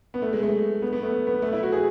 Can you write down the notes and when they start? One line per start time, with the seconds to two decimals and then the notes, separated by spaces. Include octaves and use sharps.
0.14 B3
0.22 A3
0.33 G#3
0.43 A3
0.82 B3
0.93 B3
1.03 A3
1.27 B3
1.42 A3
1.53 E4
1.63 F#4
1.72 G#4